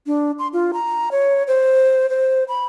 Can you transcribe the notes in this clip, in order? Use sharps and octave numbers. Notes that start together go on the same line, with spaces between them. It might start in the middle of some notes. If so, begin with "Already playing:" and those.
D4
C6
F4
A#5
C#5
C5
C5
B5